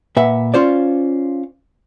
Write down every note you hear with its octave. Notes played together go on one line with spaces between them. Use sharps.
A#2 B4 E5 F#5
C#4 F4 C5 D5